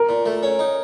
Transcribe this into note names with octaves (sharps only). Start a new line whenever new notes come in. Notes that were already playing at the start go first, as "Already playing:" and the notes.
Already playing: A#4
A#2
A3
C#4
D#4